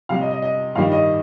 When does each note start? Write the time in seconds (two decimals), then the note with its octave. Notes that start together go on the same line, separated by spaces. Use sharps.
0.09 C3 G3 F5
0.21 D#5
0.31 D#5
0.42 D#5
0.75 G2 D#3 G3 F5
0.92 D#5